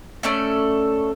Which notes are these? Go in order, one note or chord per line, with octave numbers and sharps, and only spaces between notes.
A3 C#4 A4 D5